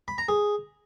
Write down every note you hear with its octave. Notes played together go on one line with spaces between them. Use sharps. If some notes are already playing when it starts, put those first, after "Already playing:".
B5
A#5
G#4